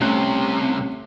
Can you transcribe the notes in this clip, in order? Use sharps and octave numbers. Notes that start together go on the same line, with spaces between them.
C2 C3 A3 C#4 F#6